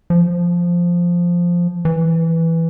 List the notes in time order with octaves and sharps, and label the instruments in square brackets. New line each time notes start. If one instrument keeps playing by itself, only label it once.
[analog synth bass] F3
E3